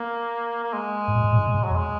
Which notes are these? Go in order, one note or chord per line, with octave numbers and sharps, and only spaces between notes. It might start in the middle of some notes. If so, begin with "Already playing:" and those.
Already playing: A#3
A#3
G#3
G#2
A#2
G#2
A#2
G#2
A#2
G#2
F#3
E2
G#3